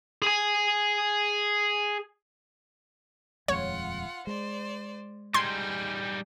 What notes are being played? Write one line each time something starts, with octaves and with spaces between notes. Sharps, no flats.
G#4 G#5
D#1 F2 G#3 F4 C#5 F#5
G#3 C5 D5
G3 D#4 G#4 C6 G#6